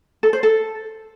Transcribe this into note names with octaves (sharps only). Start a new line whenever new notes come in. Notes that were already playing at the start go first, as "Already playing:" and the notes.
A4
C5
A4